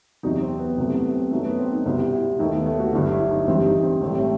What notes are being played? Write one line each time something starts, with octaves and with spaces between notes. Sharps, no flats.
E2 C3 F#3 D#4
C4
B3
C2 C3 F#3 A3 B3
B3
C4
F#2 F#3 A3 D#4
B3
C4
D#4
C2 B2 G3 C4
E4
D#2 D#3 A3 D#4
B3
A3
F#4
G1 G2 F#3 E4
E4
D#4
A1 G2 E3 G3 C4
D#4
C4
A1 A2 G3 C4
A3